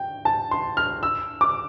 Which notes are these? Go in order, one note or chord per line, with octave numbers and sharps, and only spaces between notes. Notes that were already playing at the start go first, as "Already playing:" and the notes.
Already playing: G5
A5
C6
F6
E6
D6